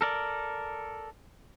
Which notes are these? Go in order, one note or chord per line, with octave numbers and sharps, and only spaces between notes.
A4 A#4 D5